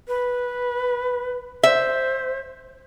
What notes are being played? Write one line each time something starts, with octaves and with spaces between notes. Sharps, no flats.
B4
C5 E5